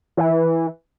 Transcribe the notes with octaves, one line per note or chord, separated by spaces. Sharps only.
E3